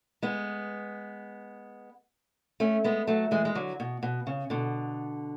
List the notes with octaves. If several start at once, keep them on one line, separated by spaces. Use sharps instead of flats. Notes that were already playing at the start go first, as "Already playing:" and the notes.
G#3 B3
A3 C#4
G#3 B3
F#3 A3
E3 G#3
G#3
D3 F#3
B2
B2
C#3
B2 D3